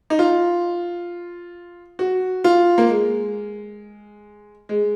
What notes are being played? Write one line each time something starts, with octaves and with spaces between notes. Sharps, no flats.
D#4
F4
F#4
F4
A#3
G#3
G#3